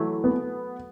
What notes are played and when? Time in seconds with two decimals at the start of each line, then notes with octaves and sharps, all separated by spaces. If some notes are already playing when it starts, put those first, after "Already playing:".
Already playing: E3 F#3 A3
0.24 B3